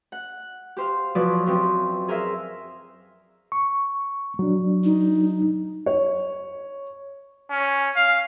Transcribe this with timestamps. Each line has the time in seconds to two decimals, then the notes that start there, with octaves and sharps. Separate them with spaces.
0.12 F#5
0.77 G4 C5 F5
1.15 E2 F3 F#3 B4 D5
1.46 F#2 F3 C4 G4
2.08 G#4 A#4 C5 E5 F5
3.52 C#6
4.39 F#3 D4
4.84 D#4
5.86 C#5
7.50 C#4
7.96 F5